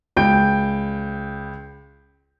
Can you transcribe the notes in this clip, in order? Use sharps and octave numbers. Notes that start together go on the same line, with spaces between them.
C#2 G5 G6 D7